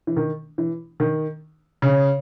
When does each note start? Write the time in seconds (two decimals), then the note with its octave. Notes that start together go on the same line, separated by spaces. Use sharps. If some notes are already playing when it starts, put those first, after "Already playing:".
0.07 E3
0.16 D#3
0.58 E3
1.00 D#3
1.82 C#3